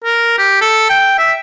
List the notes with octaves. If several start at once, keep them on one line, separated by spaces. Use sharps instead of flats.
A#4
G4
A4
G5
E5